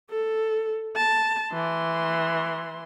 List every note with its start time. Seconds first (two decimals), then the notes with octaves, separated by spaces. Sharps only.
0.10 A4
0.96 A5
1.53 E3 C6